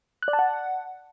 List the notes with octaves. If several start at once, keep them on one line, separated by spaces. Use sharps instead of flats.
F#6
D5
A5
F#5